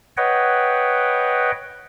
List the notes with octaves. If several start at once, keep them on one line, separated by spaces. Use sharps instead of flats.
B4 C#5 D#5 F#5 G5